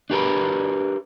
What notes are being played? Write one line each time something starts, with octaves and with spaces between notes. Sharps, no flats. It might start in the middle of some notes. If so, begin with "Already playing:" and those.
D4 G4 A#4 B4